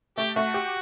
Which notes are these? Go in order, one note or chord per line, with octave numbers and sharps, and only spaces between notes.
A3 G4
A3 F#4
G4